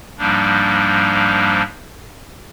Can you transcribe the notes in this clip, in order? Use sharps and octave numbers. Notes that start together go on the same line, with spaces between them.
G#2 F3 G3 A#3 D4